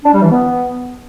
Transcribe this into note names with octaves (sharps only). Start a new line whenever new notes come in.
D4
G3
E3
B3